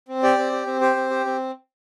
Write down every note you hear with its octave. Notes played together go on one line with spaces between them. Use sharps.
C4
G4 D5
C4
G4
C4
G4 C5
C4
G4
C4